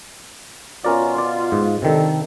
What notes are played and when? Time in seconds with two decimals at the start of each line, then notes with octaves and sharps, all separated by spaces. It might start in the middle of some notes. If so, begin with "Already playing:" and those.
0.84 B2 C#4 F4 A#4 D5
1.18 D5
1.52 G#2
1.82 C3 D#3 D4 A4